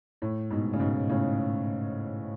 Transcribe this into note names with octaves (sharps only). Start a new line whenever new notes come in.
A2
G#2 B2
C#3
G#2 B2
A2 C#3